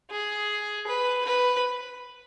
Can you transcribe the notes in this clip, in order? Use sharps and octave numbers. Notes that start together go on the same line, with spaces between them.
G#4
B4
B4